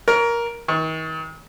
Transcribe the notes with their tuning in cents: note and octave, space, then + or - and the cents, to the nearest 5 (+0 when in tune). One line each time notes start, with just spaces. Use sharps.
A#4 +10 C#5 +40
D#3 +40 C#6 +0